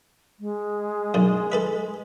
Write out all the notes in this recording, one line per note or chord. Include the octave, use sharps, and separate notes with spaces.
G#3
B1 F#2
A4 B4 E5